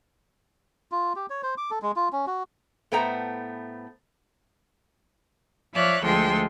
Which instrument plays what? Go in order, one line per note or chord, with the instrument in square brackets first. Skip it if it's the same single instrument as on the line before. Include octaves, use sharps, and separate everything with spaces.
[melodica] F4
G4
C#5
C5
D6
A4
G#3
F4
C#4
F#4
[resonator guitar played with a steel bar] A2 A3 B3 C5 G5 A#5
[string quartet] F3 C#5 D5 E5 F5 F#6
D2 F3 G#3 A4 G5 C6